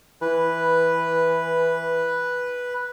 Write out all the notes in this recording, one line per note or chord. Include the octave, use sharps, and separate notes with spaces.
E3 B4